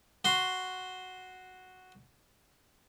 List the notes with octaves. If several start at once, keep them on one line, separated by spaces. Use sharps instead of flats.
F#4 C6